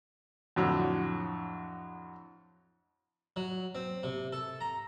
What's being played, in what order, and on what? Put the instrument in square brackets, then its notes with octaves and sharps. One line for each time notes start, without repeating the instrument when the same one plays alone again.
[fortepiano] F2 A2 D3 F#3
[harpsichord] F#3
C4
C3
A4
A#5